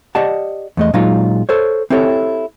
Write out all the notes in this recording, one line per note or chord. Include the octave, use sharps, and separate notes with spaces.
G4 D5 D#5 F#5 A5
E2 A3 D#5
A#2 F#3 G#3 D#4 F4
A4 C5 C#5
C4 E4 G4 A4 C#5